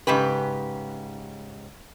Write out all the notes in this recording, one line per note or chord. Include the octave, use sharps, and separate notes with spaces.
G#2 C#3 G4 B4